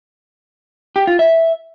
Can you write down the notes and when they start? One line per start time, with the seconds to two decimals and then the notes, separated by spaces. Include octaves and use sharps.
0.96 G4
1.07 F4
1.19 E5